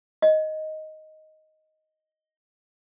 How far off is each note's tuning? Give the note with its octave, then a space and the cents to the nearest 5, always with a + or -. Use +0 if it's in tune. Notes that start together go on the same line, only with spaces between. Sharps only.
D#5 +5